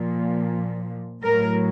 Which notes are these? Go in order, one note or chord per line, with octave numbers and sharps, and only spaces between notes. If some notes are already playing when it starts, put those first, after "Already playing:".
Already playing: A#2 F3
A2 F#3 A#4